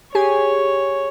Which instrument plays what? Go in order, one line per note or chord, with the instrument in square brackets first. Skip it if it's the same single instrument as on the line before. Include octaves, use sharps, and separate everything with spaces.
[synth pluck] G4 G#4 G#5 [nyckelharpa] C#5